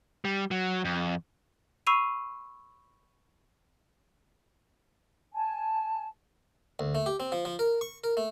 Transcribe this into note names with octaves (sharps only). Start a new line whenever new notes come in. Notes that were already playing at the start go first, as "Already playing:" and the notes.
G3
F#3
F2
B5 C#6 E6 C7 D#7 F7
G#5 A5
D2
A3
G4
C4
F3
F3
A#4
C#6
A#4
A3